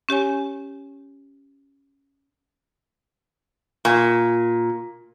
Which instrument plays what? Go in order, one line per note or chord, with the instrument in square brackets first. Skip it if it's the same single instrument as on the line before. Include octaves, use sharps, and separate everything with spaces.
[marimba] C#4 G4 C#5 G#5
[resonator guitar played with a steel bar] A#2